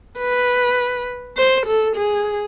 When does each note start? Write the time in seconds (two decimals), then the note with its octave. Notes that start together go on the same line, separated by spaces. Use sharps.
0.18 B4
1.37 C5
1.66 A4
1.96 G#4